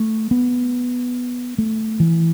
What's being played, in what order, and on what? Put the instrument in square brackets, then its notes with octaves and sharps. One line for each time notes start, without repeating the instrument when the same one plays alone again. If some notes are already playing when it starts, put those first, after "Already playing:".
Already playing: [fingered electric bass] A3
B3
A3
E3